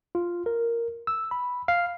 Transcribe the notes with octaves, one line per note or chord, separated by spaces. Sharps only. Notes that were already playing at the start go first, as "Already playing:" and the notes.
F4
A#4
E6
B5
F5